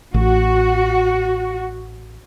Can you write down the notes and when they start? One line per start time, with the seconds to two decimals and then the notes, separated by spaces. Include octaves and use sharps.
0.14 A1 F#4